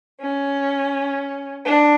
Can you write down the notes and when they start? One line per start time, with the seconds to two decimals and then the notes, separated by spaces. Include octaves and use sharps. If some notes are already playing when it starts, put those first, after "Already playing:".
0.21 C#4
1.65 D4